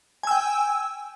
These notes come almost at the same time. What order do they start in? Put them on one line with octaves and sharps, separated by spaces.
G#5 E6 G5